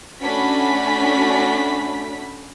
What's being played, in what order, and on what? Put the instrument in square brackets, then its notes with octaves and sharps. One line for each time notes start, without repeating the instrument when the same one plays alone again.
[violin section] A3 C#4 D4 F#4 B5 B6